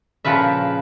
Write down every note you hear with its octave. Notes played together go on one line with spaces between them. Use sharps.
A#2 C#3 F3 B4 E5